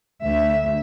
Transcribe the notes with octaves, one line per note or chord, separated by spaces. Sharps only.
D2 E5